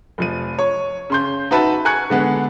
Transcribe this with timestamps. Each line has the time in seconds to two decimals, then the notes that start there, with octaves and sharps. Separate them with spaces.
0.18 F1 F3 D#7
0.59 C#5
1.10 C#3 C6 G6
1.51 D#4 F#4 B4 E5 A5 B5
1.85 G#5 A#5 C#6 F#6 G#6 C#7
2.10 D3 G#3 B3